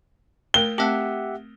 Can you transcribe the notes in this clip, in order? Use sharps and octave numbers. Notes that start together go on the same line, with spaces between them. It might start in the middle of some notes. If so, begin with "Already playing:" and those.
A3 A#4 G5 G7
A3 C4 G4 E5 F#5 A5